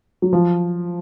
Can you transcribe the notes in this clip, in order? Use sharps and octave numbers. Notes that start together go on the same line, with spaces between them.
F#3
F3